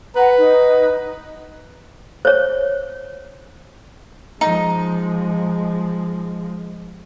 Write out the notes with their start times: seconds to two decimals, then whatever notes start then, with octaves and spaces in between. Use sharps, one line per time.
0.16 B4 F#5 A#5
0.38 D#4
2.25 C5 C#5
4.41 F3 G#3 D#4